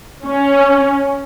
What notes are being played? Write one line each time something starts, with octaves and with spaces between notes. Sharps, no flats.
C#4